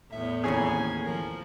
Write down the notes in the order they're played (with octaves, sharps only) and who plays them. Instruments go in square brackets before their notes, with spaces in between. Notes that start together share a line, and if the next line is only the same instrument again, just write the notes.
[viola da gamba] E2 A2 [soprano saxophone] E5
[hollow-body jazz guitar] D#2 E3 C4 [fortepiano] C#4 G#4 [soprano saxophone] G#5
[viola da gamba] F3 [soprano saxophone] A#4